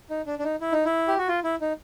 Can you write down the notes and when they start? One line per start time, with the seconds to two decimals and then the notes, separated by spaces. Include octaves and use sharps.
0.10 D#4
0.27 D4
0.39 D4
0.44 D#4
0.61 E4
0.72 D#4
0.85 E4
1.08 G4
1.18 F#4
1.28 F4
1.44 E4
1.61 D#4